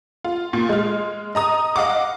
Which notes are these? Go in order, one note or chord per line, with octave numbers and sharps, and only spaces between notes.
F4
A#2
G#3 F6
D#5 A#5 D#6
D#5 F5 F#5 D6